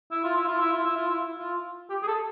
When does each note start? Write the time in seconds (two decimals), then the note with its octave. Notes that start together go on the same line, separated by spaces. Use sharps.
0.11 E4
0.24 F4
0.36 E4
0.47 F4
0.60 E4
0.73 F4
0.85 E4
0.96 F4
1.09 E4
1.39 F4
1.90 G4
2.02 G#4
2.07 A4